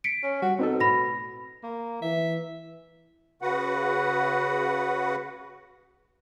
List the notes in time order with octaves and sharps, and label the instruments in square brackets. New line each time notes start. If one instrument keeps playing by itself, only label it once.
[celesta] B6 C#7 D7
[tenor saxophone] C#4
[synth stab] G3 [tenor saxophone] F#4
[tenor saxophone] B2 [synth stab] C4 D#4 A4
[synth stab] A2 [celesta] B5 A#6
[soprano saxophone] A#3
[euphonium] E3 [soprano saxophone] E5
[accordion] C#3 F#4 B4 F#5